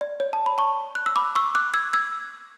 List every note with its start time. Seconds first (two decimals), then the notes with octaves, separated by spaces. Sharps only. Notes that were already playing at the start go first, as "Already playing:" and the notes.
0.01 D5
0.20 C#5
0.33 A5
0.46 B5
0.58 A5 C#6
0.95 F#6
1.06 E6
1.16 B5 D6
1.35 C#6 E6
1.55 D6 F#6
1.74 E6 G#6
1.93 E6 G#6